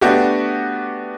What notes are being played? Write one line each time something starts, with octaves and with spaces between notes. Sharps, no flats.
A3 B3 D4 F#4 G4